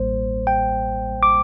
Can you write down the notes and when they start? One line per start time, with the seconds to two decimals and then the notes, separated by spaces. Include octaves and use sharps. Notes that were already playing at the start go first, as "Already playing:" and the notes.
Already playing: A1 A2 G3 A#3 C5
0.47 G5
1.23 D6